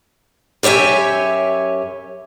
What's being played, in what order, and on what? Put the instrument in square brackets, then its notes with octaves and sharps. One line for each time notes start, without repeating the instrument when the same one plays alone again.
[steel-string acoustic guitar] F#2 G4 C#5 E5 G#5